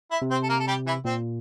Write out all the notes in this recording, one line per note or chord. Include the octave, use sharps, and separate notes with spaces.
E4 E5
C3
C4 C5
A4
A#3 A#4
A4
G3 G4
E3 E4
A#2 C4